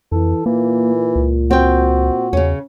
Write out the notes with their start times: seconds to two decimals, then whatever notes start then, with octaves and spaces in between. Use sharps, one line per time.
0.12 F2 E3 A4
0.46 A#2 E3 A#3
1.16 C#2
1.51 C4 F#4 G5
2.33 E2 C#3 C#4